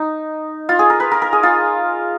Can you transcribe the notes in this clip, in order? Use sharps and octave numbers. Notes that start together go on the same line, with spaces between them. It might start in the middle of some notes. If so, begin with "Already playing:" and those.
Already playing: D#4
F4
G#4
A#4
B4
A#4
A#4
G#4
F4